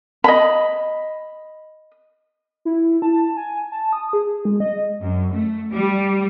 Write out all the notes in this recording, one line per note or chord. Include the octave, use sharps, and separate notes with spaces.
D#5 B5
E4
A5
G#5
A5
D#6
G#4
G#3
D#5
F#2
A3
G3